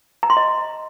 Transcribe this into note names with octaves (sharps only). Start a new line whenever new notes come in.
A#5
C6
D#5